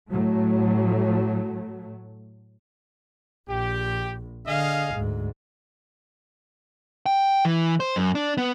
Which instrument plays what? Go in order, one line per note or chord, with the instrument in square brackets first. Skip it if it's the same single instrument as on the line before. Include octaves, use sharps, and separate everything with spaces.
[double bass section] A2 F#3 A3
[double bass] A#1 [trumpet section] G4
[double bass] D3 [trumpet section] G#4 D#5 F5
[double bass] D2 G#2
[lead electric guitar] G5
E3
C5
F#2
D4
B3